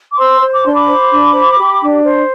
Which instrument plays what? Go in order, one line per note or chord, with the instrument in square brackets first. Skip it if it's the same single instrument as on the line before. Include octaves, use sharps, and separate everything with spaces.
[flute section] D6
C5 C6 E6
C5
D6
D4 C6
B5 D6
C5
D4
C5
G4
D4
C5